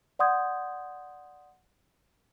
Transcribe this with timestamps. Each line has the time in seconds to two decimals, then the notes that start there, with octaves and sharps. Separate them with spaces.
0.19 D5 F#5 C6 D#6 G6 G#6